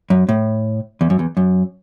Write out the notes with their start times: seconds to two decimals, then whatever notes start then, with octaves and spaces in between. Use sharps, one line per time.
0.10 F#2
0.29 A2
1.01 E2
1.10 F#2
1.19 E2
1.37 F#2